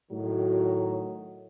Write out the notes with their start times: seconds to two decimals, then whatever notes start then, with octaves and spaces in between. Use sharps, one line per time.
0.12 A2 D#3 F#3